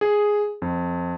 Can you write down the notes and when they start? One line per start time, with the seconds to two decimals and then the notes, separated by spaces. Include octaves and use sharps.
0.01 G#4
0.62 F2